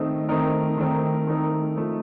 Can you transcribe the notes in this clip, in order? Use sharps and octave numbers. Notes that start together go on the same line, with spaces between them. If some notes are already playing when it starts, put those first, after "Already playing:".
Already playing: D#3 A3 C4 D#4
D#3 A3 C4 D#4 A#4
D#3 A3 C4 D#4 A#4
D#3 A3 C4 D#4 A#4
F3 A3 D#4